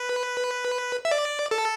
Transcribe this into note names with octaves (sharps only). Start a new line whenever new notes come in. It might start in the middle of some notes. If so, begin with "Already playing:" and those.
Already playing: B4
E5
D5
A4